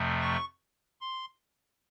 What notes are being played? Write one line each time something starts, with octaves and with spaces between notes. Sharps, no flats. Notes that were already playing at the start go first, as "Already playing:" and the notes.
Already playing: F2 C3 F3 A3
C#6
C6